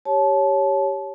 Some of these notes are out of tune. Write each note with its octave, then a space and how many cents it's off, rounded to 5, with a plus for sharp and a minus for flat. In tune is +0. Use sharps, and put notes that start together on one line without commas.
G4 +0 C#5 +0 A5 -25